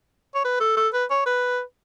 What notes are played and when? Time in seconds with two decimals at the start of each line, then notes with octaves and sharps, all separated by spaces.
0.35 C#5
0.44 B4
0.60 A4
0.77 A4
0.93 B4
1.10 C#5
1.26 B4